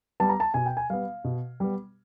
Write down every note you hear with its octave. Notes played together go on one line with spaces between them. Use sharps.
G3 B3 A5
A#5
A5
B2 G#5
G5
G#5
G3 B3 F5
B2
G3 B3